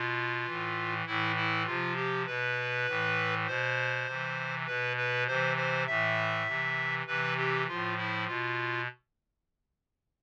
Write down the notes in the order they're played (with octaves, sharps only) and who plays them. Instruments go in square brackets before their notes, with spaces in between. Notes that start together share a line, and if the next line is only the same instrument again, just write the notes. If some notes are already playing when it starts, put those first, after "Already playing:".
Already playing: [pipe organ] B2 F4
A2 E3
A2 E3 E4
E4
C3 F3 F4
G4
B2 B4
A2 E3
B2 C5
C3 E3
B2 B4
B4
C3 E3 C5
C5
A2 E3 E5
C3 E3
C3 E3 B4
G4
A2 F3 F4
E4
B2 F4